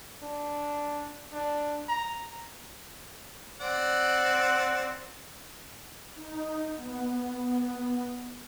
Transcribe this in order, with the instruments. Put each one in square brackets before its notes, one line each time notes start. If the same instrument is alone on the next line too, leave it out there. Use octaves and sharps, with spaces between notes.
[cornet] D4
D4
A#5
[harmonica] C4 D5 F#5
[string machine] D#4
B3